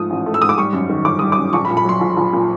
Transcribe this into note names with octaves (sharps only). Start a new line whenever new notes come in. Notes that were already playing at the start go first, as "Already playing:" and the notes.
Already playing: G#2 F3 A3 D#6
A1
A3
E6
G#2 D#6
D6
G3 C#6
F#2
D#3
G1 D6
G3 D#6
D6
F#2
A#1 C#6
B5
A#2
B5
F#3 C6
A#1
A#1
A#2